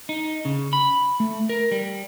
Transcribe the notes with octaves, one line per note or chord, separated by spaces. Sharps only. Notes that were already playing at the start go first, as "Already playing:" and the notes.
D#4
C#3
B5
A3
A#4
G3